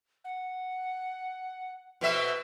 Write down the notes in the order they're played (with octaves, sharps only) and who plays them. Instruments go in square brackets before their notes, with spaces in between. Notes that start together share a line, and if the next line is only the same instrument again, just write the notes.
[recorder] F#5
[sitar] B2 C4 E5 [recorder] B4